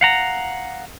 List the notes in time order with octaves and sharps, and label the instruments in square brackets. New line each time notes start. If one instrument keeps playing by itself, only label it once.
[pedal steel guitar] F5 F#5 A#5